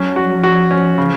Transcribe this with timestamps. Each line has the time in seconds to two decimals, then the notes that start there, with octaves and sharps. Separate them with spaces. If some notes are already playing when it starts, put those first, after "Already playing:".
Already playing: F#3 C#4
0.16 F#4
0.43 F3 F#4
0.71 C#4
0.98 C#3